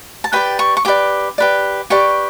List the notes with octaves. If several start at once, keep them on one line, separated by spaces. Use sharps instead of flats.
A5
G4 B4 D5 G5
C#6
C#6
G4 B4 D5 D6
G4 B4 D5
G4 B4 D5 C#6